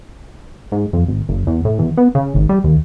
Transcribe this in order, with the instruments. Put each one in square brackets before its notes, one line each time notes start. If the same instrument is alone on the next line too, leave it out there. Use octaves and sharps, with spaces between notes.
[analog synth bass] G#2
F2
G#1
F#1
E2
A2
E2
B3
C#3
G#1
G3
D#2